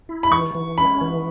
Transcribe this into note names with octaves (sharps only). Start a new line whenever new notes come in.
E4
B5
E3 C#6
E3
C#4 B5
E3